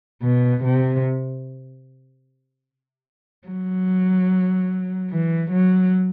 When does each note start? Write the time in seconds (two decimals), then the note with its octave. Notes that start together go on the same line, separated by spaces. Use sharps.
0.23 B2
0.64 C3
3.48 F#3
5.11 E3
5.52 F#3